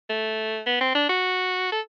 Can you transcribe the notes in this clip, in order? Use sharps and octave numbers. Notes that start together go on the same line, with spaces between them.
A3
B3
C4
D4
F#4
A4